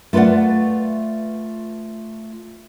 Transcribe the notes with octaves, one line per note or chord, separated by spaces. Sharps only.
A3 F4 B4 D5 F#5